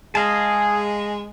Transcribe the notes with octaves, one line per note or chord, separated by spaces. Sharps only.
G#3 G#4 D#5 F5 A5